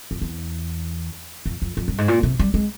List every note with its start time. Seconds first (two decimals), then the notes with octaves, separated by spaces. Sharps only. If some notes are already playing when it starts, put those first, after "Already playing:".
0.11 F2
0.21 E2
1.46 F2
1.62 F2
1.77 F2
1.88 G2
1.98 G#2
2.08 A#2
2.23 C3
2.39 G3
2.54 G#3